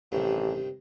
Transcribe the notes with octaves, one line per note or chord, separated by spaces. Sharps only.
A1 G2 C3 D#3